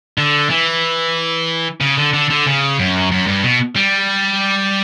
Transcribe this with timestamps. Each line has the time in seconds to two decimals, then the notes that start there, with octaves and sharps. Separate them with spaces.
0.18 D3
0.50 E3
1.81 C#3
1.97 D3
2.13 D3
2.30 D3
2.47 C#3
2.79 F#2
3.12 F#2
3.27 G2
3.43 B2
3.76 G3